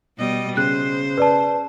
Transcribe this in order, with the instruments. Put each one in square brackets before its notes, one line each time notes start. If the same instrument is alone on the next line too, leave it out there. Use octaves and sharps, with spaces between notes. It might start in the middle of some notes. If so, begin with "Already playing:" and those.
[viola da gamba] B2 G3 D#5
[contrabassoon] C#3 [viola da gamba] C5 [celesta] F#6
[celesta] B4 D5 A5